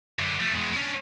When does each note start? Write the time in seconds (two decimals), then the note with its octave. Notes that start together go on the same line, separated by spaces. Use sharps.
0.19 F#2 D3
0.40 F3 A3
0.54 E2 G#3
0.77 C#4 D4